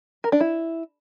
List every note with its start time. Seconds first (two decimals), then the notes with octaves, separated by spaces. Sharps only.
0.24 A#4
0.32 D4
0.41 E4